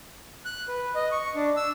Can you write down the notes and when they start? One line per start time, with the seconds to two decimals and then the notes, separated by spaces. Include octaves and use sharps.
0.45 F#6
0.68 B4
0.95 D#5
1.12 C#6
1.35 D4
1.57 E6